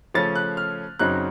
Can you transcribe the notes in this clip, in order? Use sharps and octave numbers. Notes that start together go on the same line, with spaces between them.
C#3 F3 A3 C#4 A6
F#6
F6
F#2 C#3 F#3 C4 D#4 F#6